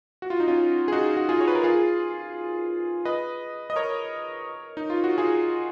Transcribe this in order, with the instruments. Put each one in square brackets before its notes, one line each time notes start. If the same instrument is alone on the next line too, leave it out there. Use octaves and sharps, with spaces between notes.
[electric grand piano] F#4
F4
D#4
C#4 F4
G#4
D#4 F#4
F#4
F4 G#4
C#5
B4
A#4
F4 G#4
B4 D#5
D#5
A#4 C#5
D#4
F4
F#4
F4 G#4